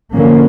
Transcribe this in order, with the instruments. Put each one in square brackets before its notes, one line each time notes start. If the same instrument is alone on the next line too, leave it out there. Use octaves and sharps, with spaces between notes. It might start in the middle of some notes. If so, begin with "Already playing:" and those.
[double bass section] D3 F3 A#3 C#4